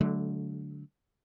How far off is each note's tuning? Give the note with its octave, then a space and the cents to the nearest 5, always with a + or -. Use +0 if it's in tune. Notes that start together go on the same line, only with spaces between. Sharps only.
D3 -10 F#3 +0 A3 -30